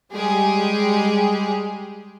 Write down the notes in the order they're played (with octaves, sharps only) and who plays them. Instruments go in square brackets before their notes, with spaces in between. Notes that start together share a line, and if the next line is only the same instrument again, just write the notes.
[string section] G3 G#3 G4 G#4